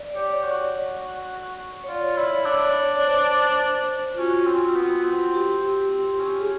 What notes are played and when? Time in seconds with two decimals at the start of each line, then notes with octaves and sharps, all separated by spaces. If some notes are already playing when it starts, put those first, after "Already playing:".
Already playing: D5
0.11 D5
0.15 G4 C#5
0.44 F#4
1.84 C#5
1.88 F4 D5
2.17 E4 C#5
2.46 D4 C#5
2.56 D5
2.66 C#5
2.75 D5
2.85 C#5
3.04 C5
4.14 F4
4.18 C#4 F#4
4.47 C4
4.76 B3
5.04 C4
5.34 G4
5.91 C4
6.20 C#4
6.40 G#4